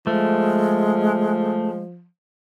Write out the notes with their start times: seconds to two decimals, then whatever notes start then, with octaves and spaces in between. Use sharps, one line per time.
0.07 F3 G#3 A3